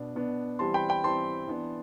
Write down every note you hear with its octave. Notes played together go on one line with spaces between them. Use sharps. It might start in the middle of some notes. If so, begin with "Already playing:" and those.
Already playing: B2 B3 D4
B2 B3 D4
E3 G3 C4 A5 C6
G5 B5
G5 B5
E3 G3 C4 A5 C6
E3 B3 D4